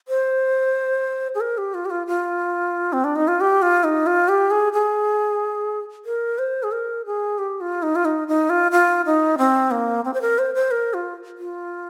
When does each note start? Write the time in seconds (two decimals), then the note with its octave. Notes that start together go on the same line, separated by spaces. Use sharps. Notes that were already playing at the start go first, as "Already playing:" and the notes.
0.08 C5
1.35 G#4
1.41 A#4
1.58 G4
1.74 F4
1.85 G4
1.90 F4
2.07 F4
2.93 C4
3.04 D4
3.16 D#4
3.28 F4
3.40 G4
3.62 F4
3.84 D#4
4.06 F4
4.28 G4
4.51 G#4
4.73 G#4
6.05 A#4
6.38 C5
6.63 G#4
6.72 A#4
7.06 G#4
7.38 G4
7.61 F4
7.82 D#4
7.95 F4
8.05 D#4
8.28 D#4
8.50 F4
8.72 F4
9.06 D#4
9.38 C4
9.71 A#3
10.05 C4
10.14 C5
10.21 A#4
10.39 C5
10.55 C5
10.71 A#4
10.94 F4
11.38 F4